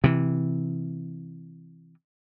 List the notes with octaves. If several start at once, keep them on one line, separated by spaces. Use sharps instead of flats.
C3 E3